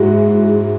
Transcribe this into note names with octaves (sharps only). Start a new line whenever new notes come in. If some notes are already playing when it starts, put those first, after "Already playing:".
Already playing: G#2 G#3 E4 F#4